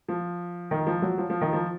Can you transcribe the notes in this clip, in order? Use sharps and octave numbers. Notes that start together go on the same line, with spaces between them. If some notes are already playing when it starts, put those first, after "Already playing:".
F3
D#3
F3
F#3
F3
F3
D#3
F3